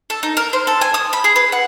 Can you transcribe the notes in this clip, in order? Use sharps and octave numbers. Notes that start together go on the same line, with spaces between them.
A4
D#4
A#4
C5
A4
G#5
D#6
B5
G#4
B4
F#5